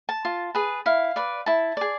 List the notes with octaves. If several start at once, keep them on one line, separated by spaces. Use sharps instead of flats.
A5
F4
G#4 B4
E4 F5
B4 D5
E4 A5
G#4 D5